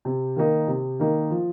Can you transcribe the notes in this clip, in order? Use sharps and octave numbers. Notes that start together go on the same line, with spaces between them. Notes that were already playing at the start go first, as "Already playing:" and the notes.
C3
D#3 A#3 D#4
C3
D#3 A#3 D#4
F3